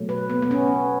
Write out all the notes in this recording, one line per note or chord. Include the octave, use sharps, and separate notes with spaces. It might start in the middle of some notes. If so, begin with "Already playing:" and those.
Already playing: B2 F#3 A3
B4
B3
B3
C#4